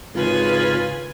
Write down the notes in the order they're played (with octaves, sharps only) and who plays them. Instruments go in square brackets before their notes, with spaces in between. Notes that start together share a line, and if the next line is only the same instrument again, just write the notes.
[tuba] G#1 [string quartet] C#3 B4 G#5 [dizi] F4